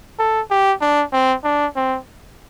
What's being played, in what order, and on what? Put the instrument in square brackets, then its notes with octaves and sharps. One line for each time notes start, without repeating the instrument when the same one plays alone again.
[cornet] A4
G4
D4
C4
D4
C4